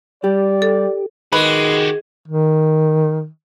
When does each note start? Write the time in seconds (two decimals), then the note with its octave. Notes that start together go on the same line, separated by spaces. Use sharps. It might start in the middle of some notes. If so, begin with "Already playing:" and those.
0.24 G3 G4 D5
0.62 A4
1.33 D#3 G#3 F#4 G4 B4
2.28 D#3